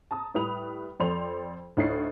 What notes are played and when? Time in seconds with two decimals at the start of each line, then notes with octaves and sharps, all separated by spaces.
0.11 A5 A#5 D#6
0.34 A2 G3 B4 B5 D#6 F7
1.00 F2 A4 C5 D5 C6 F7
1.77 D2 A2 D#4 C#5 A6 C7